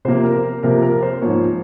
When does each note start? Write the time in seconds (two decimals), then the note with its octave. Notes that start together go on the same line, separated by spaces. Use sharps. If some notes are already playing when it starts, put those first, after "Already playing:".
0.05 C3 F3 A#3 C5
0.24 A#4
0.63 C3 F3 A#3 A#4
0.83 A#4
1.02 C5
1.22 G#2 F3 A#3 C#5